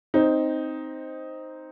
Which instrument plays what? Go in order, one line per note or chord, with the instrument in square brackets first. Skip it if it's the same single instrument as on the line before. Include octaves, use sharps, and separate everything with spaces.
[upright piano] C4 D#4